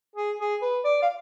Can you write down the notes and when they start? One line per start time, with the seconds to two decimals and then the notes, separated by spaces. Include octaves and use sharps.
0.16 G#4
0.40 G#4
0.62 B4
0.84 D5
1.02 F5